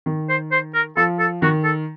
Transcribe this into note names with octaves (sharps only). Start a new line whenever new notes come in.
D#3
C5
C5
A#4
F3 A4
A4
D#3 F#4
A4